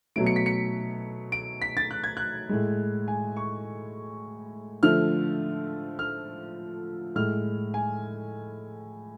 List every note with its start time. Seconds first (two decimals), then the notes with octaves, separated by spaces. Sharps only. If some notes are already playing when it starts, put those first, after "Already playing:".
0.16 B2 F#3 A3 D7
0.26 C#7
0.36 B6
0.46 C#7
1.32 D7
1.62 B6
1.77 A6
1.91 F#6
2.04 G#6
2.17 F#6
2.49 A2 G#3
3.08 G#5
3.37 C#6
4.83 D3 F3 A3 F6
5.99 F6
7.15 A2 G#3 F6
7.74 G#5